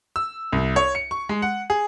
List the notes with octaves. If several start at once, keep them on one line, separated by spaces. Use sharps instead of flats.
E6
C2
C#5
C#7
C#6
G#3
F#5
G#4